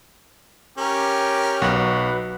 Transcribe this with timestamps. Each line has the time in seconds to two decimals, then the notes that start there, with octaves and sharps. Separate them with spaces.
0.78 C#4 G4 A#4
1.62 B1 F#4 B4